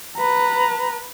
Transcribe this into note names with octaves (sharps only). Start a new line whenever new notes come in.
B4 A#5